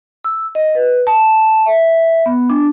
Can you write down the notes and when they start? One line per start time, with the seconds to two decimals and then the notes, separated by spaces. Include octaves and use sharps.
0.24 E6
0.55 D#5
0.75 B4
1.07 A5
1.66 E5
2.26 B3
2.50 D4